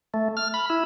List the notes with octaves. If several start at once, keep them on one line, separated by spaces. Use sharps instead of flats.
A3
F6
B5
E4